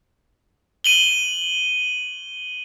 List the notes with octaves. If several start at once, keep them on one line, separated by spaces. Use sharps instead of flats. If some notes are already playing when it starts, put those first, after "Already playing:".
D#7 F#7 G7